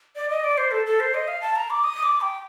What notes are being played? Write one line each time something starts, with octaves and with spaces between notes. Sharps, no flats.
D5
D#5
D5
C5
A4
A4
C5
D#5
F5
A5
A#5
D6
D#6
D6
G5